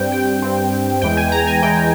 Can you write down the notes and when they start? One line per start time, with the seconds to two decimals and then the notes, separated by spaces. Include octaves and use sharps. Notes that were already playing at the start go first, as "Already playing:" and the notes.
Already playing: G2 G3 C4 G5
0.12 G5
0.42 G2 G3 C4
1.02 E2 E3 G#3 G5
1.17 G#5
1.32 A#5
1.47 G#5
1.62 E2 E3 G#3 G5